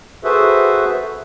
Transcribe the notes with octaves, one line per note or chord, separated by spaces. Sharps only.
F#4 G#4 A4 B4 C5 E5